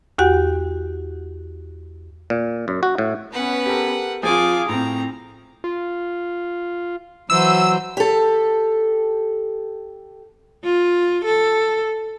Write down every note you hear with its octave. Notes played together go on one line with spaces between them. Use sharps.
E2 F#4 G4 F#5
A#2
F#2
F#4
A2
B3 C#4 B4 F#5
G4 A4 A#4
F3 C4 F4 G#4 G#5 D6
A2 C4 A#5
F4
E3 F#3 C5 E6
G4 A4
F4
A4